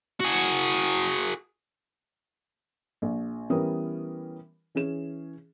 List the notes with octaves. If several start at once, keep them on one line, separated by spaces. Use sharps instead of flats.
F#4 G#4
A#1
E3 G3 B3 C#4 A#4 D#6
E3 C#4 G#4 E7